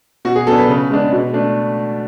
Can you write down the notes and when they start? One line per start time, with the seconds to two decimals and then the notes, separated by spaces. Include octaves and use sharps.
0.25 B2 F#4
0.35 G#4
0.47 F#3 B3 D4 A4
0.58 B4
0.69 C#3
0.90 G#3 B3 D4
1.12 B2
1.33 A3 D4